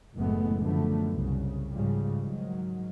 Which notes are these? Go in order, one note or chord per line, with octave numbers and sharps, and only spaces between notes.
F#1 A2 E3 G#3 A3 B3
F#2 D3 F3 A3 B3
C2 C#3
G#2 C#3 F3 G3
G#2 D#3 F#3